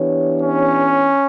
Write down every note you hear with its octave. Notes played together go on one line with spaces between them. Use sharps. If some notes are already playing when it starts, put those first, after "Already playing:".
Already playing: E3 B3 D4 G4 C#5
C#4